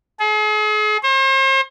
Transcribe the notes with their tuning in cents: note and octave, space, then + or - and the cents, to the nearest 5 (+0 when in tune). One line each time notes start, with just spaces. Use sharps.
G#4 +40
C5 +40